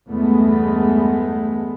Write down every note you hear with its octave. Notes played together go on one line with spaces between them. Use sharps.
E2 G2 G#3 A3 B3